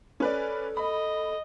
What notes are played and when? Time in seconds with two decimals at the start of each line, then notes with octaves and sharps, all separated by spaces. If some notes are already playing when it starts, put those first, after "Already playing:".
0.20 C#4 A4 B4 D5
0.77 D#5 B5